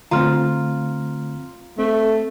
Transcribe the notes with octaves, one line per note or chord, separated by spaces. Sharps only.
D3 A3 C4 F4 A#5 C6 F6
A3 C4